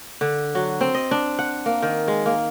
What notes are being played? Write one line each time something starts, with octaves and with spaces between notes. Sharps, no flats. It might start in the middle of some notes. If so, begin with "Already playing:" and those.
D3
F#3
C4
D#5
D4
F#5
A#3
D#3
G#3
A#3